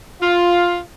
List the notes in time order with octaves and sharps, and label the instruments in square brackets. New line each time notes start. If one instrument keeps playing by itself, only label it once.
[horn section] F4